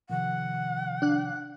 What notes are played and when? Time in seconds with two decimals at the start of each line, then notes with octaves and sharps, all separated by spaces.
0.10 C3 D#3 F3 F#5
1.02 D4 F#6